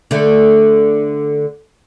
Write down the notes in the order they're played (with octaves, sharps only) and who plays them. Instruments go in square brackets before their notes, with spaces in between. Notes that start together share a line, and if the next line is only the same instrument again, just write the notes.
[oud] D3 A3